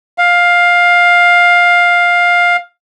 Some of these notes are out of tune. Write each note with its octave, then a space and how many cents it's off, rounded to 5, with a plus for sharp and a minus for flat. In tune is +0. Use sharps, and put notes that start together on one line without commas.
F5 +10